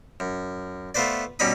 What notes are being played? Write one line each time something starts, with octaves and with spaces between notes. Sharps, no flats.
F#2
A3 B3 F4 B4 C5 D5
B2 G3 C#4 D#4 B5 D#6